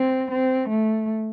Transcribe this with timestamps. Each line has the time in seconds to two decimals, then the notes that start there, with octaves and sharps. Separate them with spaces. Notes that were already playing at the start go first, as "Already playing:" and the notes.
Already playing: C4
0.31 C4
0.69 A3